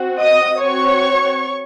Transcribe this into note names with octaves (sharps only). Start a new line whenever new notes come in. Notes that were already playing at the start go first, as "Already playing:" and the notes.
Already playing: C4 F#4
D#5 D#6
C4 F#4 C#5 C#6